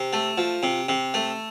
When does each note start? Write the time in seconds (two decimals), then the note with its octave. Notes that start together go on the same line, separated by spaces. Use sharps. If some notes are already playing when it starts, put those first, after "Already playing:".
Already playing: C3
0.13 A3
0.38 F3
0.63 C3
0.89 C3
1.14 A3